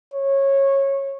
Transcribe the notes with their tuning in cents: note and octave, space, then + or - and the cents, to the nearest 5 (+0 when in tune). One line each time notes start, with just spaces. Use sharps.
C#5 -20